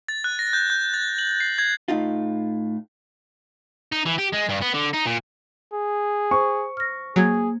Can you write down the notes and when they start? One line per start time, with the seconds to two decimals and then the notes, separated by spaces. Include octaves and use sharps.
0.09 A6
0.24 F#6
0.39 A#6
0.53 G6
0.70 G6
0.94 A6
1.18 F#7
1.40 C7
1.58 G#6
1.88 A2 D#4 F4
3.92 D#4
4.06 E3
4.19 G4
4.34 G#3
4.50 G2
4.62 B3
4.74 D3
4.94 D#4
5.06 A#2
5.73 G#4
6.31 C5 C#6
6.77 F6 A#6
7.16 F#3 A#3 G#4 G#6